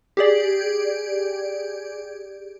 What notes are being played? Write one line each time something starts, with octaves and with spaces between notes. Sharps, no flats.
G4 G#4 D5